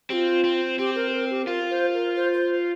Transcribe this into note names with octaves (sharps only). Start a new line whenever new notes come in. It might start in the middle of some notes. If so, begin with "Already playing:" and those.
C4 F4 G4
C4
C4 G4
A#4
A#4
G4
F4 A#4
C5
A#4
C5
C5